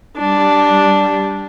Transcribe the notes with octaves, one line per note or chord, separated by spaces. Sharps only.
G3 D4